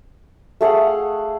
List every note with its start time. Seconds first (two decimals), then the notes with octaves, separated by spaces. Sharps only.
0.61 A3 G#4 F5 F#5